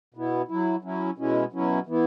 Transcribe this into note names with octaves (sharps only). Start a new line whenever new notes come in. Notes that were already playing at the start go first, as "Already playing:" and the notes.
B2 B3 E4
F#3 E4
F#3 C#4 E4
B2 G#3 C#4 E4
B2 F#3 C#4 E4
E3 B3 E4